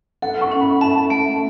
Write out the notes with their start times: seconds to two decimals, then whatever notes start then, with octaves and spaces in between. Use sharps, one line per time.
0.22 A4 F#5
0.41 C#6
0.52 C#4
0.61 B5
0.81 E5 A5
1.10 A3